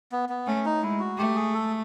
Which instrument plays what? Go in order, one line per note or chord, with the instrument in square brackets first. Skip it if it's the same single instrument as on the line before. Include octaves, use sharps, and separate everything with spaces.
[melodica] B3
B3
[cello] A3 [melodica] C#4
[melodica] D#4
[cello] G#3 [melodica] E4
[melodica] F#4
[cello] A3 [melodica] G4
[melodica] G#4
A4